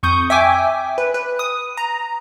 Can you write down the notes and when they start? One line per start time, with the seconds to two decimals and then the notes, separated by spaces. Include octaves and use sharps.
0.03 F2 C#6 D#6 G6
0.30 E5 G5 G#5 D6
0.98 B4
1.14 B4
1.39 D#6
1.77 A#5